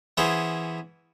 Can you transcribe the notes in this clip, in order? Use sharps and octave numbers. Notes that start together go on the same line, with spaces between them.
E3 B3 C#4 G#4 C5